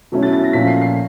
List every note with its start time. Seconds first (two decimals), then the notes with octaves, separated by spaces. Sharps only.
0.12 B2 F#3 A3 C#4 E4
0.23 A6
0.33 A6
0.44 A#6
0.53 A#2 F3 A3 C#4 B6
0.67 C7
0.81 C7